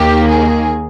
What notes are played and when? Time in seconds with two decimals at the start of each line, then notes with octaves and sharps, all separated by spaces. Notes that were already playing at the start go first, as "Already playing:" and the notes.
Already playing: D#2 D#3 A#3 G4
0.27 G#4